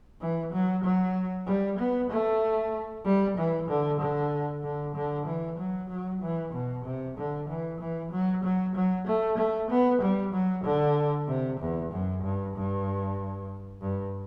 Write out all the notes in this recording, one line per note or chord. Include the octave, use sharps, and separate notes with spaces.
E3
F#3
F#3
G3
B3
A3
G3
E3
D3
D3
D3
D3
E3
F#3
F#3
E3
B2
C3
D3
E3
E3
F#3
F#3
F#3
A3
A3
B3
G3
F#3
D3
C3
E2
F#2
G2
G2
G2